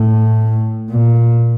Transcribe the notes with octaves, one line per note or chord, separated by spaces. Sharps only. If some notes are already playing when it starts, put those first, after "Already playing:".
Already playing: A2
A#2